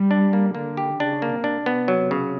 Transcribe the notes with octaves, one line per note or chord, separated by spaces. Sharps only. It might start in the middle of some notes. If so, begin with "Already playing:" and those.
Already playing: G3
D4
A#3
D3 A#3
G4
C#3 D4
A#3
C3 D4
B3
F#3
C#3